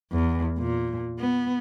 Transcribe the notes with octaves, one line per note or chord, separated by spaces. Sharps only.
E2
A#2
B3